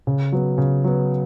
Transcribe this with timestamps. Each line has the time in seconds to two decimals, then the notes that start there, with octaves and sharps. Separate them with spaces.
0.07 C#3
0.32 F#3 B3
0.58 C#3
0.84 F#3 B3